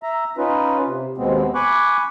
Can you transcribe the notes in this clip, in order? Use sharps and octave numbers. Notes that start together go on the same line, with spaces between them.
E5 A#5
C#4 D#4 F4 B4
C3
D#2 B2 G#3 B3 C4
G#5 B5 C#6 D6 F#6